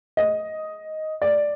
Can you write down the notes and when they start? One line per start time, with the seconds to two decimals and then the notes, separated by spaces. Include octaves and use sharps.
0.17 D#5
1.22 D5